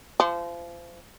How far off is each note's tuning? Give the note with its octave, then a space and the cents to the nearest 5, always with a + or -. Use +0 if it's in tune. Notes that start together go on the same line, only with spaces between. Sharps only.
F3 -30